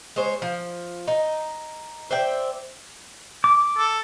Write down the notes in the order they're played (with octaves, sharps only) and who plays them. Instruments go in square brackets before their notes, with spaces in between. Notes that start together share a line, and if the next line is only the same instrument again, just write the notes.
[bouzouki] G#3 C5 C#5
F3
D#4
C5 D5 E5 G5
[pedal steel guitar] D6
[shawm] A4